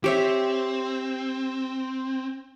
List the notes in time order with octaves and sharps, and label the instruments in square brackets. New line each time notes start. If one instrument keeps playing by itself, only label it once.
[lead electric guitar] C4 [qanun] G4 C#5 E5